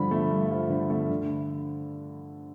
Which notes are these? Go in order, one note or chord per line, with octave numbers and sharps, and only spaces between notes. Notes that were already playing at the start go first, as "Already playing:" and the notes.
Already playing: G2 D3 F3 B5
A3
G2
F3
D3
A3
D3